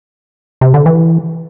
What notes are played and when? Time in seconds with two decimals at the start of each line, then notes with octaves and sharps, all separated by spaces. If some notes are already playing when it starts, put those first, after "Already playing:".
0.61 C3
0.74 D3
0.86 E3